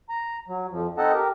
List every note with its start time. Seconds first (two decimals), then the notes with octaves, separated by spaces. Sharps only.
0.09 A#5
0.48 F#3
0.71 F2 F3
0.98 C4 D#4 A4 D#5 F#5 A5
1.14 G4 A#4